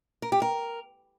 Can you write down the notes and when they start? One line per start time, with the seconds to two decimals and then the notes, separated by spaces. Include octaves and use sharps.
0.22 A#4
0.32 G4
0.42 A#4